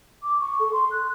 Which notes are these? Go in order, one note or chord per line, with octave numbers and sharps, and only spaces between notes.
D6
C#6
A4
C6
F#6